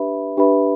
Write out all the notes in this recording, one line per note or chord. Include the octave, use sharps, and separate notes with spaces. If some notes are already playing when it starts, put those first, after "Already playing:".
Already playing: D4 G4 B4 E5 B5
D4 G4 B4 E5 B5